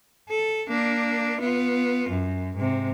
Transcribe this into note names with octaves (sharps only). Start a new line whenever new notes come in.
A4
A#3 D4
B3 F4
F#2
G#2 C3